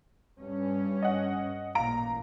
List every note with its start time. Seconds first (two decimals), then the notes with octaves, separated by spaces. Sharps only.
0.40 G2 C#4
1.02 D#5 F#5
1.75 A1 A#2 F5 A#5 D7